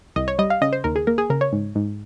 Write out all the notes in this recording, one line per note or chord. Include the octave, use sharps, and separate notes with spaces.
C2 D#5
C#5
G3 D#5
F5
C#3 D#5
C5
D#2 A#4
G#4
A#3 A#4
G#4
C#3 A#4
C#5
G#2
G#2